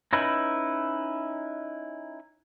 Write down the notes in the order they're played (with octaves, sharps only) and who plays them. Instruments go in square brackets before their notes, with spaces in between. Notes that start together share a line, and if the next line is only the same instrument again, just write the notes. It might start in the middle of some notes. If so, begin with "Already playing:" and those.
[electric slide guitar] C#4 D#4 E4 B4